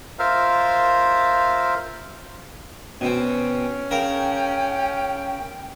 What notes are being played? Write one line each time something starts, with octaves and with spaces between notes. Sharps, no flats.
F4 A#4 C5 E5 F5
B2 C4 C#4
C#3 A#4 G5